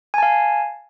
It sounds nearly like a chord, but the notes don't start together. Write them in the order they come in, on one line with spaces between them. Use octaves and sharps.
G#5 A5 F5